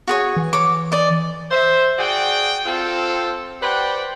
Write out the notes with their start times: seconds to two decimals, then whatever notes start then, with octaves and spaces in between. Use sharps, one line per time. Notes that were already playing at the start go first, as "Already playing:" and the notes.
0.07 F#4 G#4 C#5
0.37 E3
0.53 C#5 D6
0.92 D5 D#5
1.51 C5 E5
1.99 F#4 G#4 D5 F#5 G5
2.66 C4 F4 A4
3.62 G4 B4 C5 D5 F#5 G5